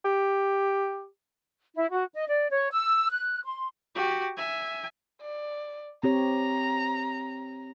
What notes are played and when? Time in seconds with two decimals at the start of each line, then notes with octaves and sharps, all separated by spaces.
0.05 G4
1.74 E4
1.91 F#4
2.13 D#5
2.28 D5
2.51 C#5
2.72 E6
3.11 F#6
3.45 C6
3.95 F#4 G4
4.37 E5 G#5
5.22 D5
6.04 C4 G4 C#5 A#5